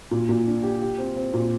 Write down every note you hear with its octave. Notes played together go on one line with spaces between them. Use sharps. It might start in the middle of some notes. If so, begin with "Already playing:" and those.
A#2
A#2
D4
G4
G4
C4
C4
A#2